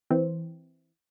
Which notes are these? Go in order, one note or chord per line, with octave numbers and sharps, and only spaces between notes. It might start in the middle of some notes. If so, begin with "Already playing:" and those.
E3 C4